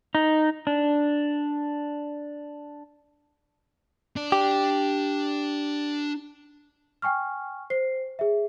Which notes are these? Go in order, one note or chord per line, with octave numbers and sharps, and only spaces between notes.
D#4
D4
D4 D5
G4
G5 G#5 C#6 F6
C5 C7
G#4 E5